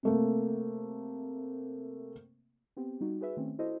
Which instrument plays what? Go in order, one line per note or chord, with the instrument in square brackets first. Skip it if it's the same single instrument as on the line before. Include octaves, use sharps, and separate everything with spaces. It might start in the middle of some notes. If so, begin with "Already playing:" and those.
[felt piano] C3 A3 A#3
[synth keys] B3 C4 G4
G3 D#4 F#4
F#4 G#4 B4 E5
D#3 A3 C4 C#4
E4 F#4 A4 C5 D#5